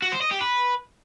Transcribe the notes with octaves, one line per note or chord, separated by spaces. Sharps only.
F#4
C5
D#5
G4
B4